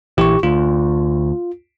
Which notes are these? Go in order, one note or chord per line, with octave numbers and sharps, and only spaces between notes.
A#1 E3 G4 C#6
D2 F4